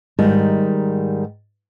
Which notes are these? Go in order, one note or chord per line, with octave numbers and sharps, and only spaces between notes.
G#2 D#3 G3